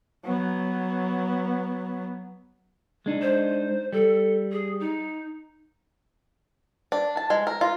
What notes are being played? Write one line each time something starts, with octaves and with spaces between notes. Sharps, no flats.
F#3 B3
G#3 D4 D#4
C5
G3 A4
G#4
D#4
D4
A5
G#3
A#4
F4